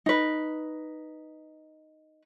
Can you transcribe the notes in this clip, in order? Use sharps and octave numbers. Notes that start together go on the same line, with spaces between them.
D#4 B4